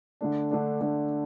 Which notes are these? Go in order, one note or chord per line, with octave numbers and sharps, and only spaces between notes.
D3 A3 D4
D3 A3 D4
D3 A3 D4